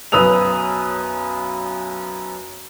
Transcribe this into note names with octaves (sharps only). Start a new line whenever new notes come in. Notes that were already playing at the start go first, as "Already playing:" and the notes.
B1 F#2 B4 D#6 E6 F7